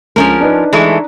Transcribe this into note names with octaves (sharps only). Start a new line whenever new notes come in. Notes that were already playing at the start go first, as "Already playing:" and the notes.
C#2 F3 C#4 A#4
D4 D#4 B4
E3 G#3 A3